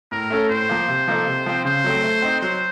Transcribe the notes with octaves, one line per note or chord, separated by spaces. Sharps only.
A2 A#4
A3 C#4 A4
A2 C5
F3 A#3
C3
F3 A#3 D#4 A4
C3
F3 C4
C#3 C5
F#3 A3 C4
A3
C4 D#4
F#3 C5